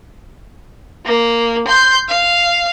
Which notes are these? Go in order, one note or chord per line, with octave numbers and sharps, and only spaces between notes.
A#3
C6 G6
F5